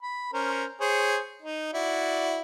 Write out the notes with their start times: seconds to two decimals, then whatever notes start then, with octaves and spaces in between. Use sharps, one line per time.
0.03 B5
0.33 C#4 A#4 C5
0.80 G#4 C5 C#5
1.42 D#4
1.73 E4 F#4 D5